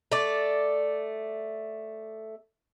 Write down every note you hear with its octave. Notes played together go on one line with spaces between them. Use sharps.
A3 D5